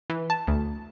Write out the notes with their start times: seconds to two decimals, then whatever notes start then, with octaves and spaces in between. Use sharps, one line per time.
0.10 E3
0.30 A5
0.47 D2